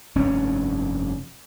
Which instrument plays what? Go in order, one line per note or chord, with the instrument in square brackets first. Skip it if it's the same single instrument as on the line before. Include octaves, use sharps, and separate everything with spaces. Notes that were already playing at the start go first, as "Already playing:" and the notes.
[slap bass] F1 G2 C#4